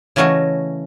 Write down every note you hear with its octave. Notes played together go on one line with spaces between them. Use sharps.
C#3 E3 A3 C#4 F#4 D#5